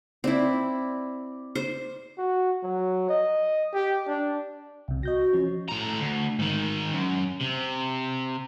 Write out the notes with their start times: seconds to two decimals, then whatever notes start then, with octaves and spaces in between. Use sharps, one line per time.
0.24 C4 E4 D5 D6
1.55 C5
2.17 F#4
2.63 F#3
3.09 D#5
3.74 G4
4.07 D4
4.88 C2 C3
5.03 F#4 D#5 G6 A#6
5.33 F3 C#4
5.69 A2 A#5
6.00 D2
6.39 G#2 D#3
6.93 F#2
7.41 C3